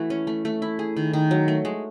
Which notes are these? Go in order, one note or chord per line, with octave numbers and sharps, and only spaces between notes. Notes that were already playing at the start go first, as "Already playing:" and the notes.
Already playing: E3 A3 F#4
C#4
A3
A3
E4
G#4
D#3
D#3
F#3
A3
G#3